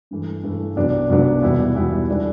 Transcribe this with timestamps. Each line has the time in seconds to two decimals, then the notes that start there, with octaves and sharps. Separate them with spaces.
0.11 G2 E3 A3
0.43 G2 E3 A3
0.76 C2 C3 F#3 B3 D4
1.10 C2 C3 F#3 B3 D4
1.42 E2 B2 G3 B3 E4
1.75 E2 B2 G3 B3 E4
2.09 D3 G3 D4 A4